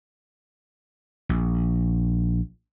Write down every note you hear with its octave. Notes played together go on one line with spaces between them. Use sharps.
A#1